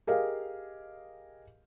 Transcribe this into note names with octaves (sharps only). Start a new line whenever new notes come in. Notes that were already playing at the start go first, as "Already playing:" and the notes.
G4 G#4 A#4 D#5 F5